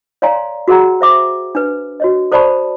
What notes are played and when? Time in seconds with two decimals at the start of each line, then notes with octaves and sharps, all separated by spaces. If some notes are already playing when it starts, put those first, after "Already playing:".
0.22 C#5 D5 F5 G#5 A#5 C6
0.68 F#4 G#4 A#4 F#5 G5 A#5
1.01 C5 E5 D6
1.55 D4 B4
2.00 F#4 C#5 D#5
2.32 A4 C5 D5 A5 B5 C#6